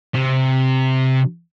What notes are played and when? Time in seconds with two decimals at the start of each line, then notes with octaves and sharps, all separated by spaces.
0.14 C3